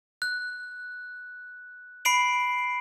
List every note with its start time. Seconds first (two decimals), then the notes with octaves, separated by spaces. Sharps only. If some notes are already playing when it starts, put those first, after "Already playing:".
0.22 F#6
2.05 B5 C7 D7 F#7